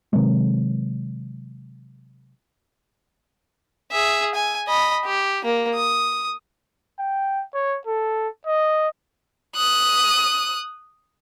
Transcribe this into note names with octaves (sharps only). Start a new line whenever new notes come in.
C3 D#3 F#3 G#3
G#4 E5
G#5
D#5 B5
G4
A#3
D#6
G5
C#5
A4
D#5
D#6 F#6